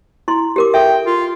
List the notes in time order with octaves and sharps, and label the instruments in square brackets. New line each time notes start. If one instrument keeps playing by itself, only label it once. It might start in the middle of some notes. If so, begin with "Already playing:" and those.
[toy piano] E4 C6
G4 A#4 D6
[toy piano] A4 E5 [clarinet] G5
[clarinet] F4